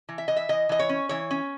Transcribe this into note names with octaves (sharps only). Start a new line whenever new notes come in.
E3
E5
E3 D#5
E5
E3 D#5
E3 D#5
C#5
C#4
E3 C#5
C#4